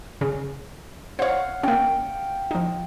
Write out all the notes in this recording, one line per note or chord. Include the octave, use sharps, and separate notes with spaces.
C#3
C5 C#5 F5 F#5
A#3 C#4 G5
F3 D#4